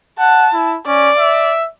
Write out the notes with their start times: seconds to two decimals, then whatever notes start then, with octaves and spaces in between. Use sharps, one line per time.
0.19 F#5 A5
0.53 E4
0.87 C#4 D5
1.18 E5